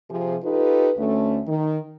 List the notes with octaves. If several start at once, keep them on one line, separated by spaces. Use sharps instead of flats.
C3 F3 G#4
D#4 F4 G4 A4 B4
D2 A3 C#4
D#3